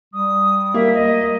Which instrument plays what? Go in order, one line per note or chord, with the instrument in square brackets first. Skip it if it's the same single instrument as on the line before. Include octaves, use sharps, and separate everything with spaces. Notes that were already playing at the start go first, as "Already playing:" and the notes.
[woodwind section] G3 [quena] D#6
[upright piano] A#3 [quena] E5
[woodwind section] D2 [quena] D#5